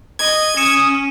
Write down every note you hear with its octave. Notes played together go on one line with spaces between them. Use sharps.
D#5 G#6
C#4 D#6 C#7 D#7 E7